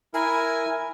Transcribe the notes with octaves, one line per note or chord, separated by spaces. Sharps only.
E4 A#4 G#5